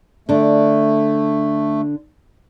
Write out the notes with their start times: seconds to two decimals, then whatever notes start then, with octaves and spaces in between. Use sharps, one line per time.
0.29 D3 A3 D4